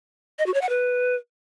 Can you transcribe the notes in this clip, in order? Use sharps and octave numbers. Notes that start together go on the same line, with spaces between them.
D#5
F#4
C#5
F#5
B4